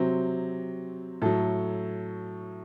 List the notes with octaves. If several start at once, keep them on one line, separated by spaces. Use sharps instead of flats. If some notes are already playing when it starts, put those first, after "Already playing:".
Already playing: C3 F#3 C4
A2 F#3 A4